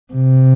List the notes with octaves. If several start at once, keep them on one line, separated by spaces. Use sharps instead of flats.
C3